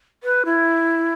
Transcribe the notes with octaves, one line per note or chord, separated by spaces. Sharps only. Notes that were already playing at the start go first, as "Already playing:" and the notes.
B4
E4